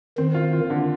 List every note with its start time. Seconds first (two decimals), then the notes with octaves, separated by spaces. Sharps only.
0.18 D#3 C4
0.34 F4
0.53 F4
0.70 D3